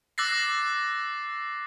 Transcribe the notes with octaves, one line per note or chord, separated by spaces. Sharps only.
D6 E6 F#6 A6 A#6 C7